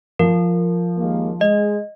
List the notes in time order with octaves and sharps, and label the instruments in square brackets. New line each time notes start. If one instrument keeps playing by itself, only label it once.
[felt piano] F3 [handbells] A#4
[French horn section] D#2 G#3 A#3
[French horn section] G#3 [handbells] D#5